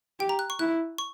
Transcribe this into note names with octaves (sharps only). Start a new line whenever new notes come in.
G4 G5
A#5
F#6
C#6
E4 F#6
C#6